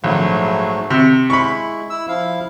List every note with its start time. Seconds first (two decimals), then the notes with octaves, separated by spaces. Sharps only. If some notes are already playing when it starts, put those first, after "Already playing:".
0.04 A#1 G#2 F#3 A3
0.90 C3
1.30 G#3 E4 B5 C#6
1.90 E4 E6
2.08 F3 E4 F5